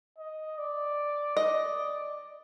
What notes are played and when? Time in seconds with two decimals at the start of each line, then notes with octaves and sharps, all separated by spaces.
0.19 D#5
0.58 D5
1.37 D5 D#5